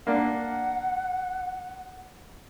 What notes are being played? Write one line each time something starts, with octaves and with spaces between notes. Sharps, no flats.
A#3 D4 F#5